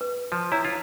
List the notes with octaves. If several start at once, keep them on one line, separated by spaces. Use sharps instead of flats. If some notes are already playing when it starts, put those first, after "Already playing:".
B4
F3
E4 C#5 A#5
F4